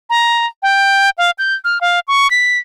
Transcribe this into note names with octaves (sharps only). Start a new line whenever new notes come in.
A#5
G5
F5
G6
F6
F5
C#6
B6